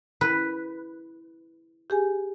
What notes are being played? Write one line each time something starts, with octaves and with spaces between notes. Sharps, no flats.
E4 B4
G4 G#4 G#5